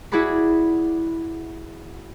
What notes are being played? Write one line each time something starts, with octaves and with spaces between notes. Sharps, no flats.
E4 F#4 G#4 D5 F#5 B5